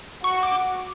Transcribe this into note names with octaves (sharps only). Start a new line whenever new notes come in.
F#4 C#6
D6